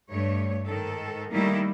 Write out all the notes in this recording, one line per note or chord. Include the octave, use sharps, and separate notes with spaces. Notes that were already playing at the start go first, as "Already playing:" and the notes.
G2 A3 C#5
G#2 D#3 A4
D#3 G3 A3 A#3 D#4 E4